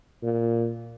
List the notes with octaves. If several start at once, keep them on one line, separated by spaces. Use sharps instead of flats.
A#2